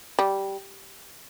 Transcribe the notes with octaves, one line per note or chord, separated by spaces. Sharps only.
G3